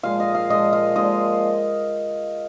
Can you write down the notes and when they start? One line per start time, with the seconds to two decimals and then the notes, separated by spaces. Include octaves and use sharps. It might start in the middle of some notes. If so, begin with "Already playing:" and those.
0.03 A#2 F3 G#3 F5
0.20 D#5
0.35 F5
0.50 A#2 F3 G#3 D#5
0.73 F5
0.96 A#2 F3 G#3 D#5